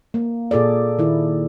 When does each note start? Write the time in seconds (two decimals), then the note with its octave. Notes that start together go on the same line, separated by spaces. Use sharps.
0.14 A#3
0.51 A#2 G#4 A4 D5
0.99 D#3 E4